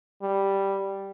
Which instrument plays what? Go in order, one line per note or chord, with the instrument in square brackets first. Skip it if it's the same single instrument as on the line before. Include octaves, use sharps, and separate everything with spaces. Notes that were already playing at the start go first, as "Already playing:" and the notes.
[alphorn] G3